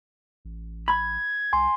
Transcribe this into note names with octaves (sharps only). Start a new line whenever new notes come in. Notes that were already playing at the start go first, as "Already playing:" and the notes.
A1
B5 G#6
C2 G#5 C6